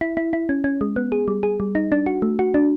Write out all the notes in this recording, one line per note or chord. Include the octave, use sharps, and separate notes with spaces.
E4
E4
E4
C#4
C#4
G#3
B3
G#4
G3
G#4
G3
D#4
D4
F#4
A3
F#4
D4